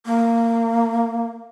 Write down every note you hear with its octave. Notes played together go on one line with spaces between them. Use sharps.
A#3